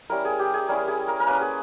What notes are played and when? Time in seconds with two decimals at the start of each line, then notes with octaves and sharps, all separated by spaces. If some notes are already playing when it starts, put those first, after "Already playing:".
0.10 G3 C#4 E4 A#4
0.25 G#4
0.39 G4
0.54 G#4
0.69 G3 C#4 E4 A#4
0.88 G#4
1.08 A#4
1.20 A#4
1.27 A#3 C#4 E4 B4
1.41 G#4